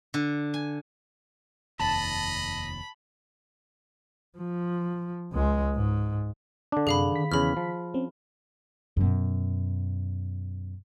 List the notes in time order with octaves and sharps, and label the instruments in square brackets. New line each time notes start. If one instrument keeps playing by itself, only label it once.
[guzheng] D3
G#5
[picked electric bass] F1 D#2 [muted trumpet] D#5 [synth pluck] A5 [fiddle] B5
[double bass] F3
C#2 G#3
G#2
[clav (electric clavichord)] D3 D4
[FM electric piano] F#2 C3 [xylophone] G#4 F5 B5
[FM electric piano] D#3 B6
[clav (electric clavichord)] E2 C#3 [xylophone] B5 F6
[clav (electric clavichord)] F3
[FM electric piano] C4 C#4
[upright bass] F#2 B2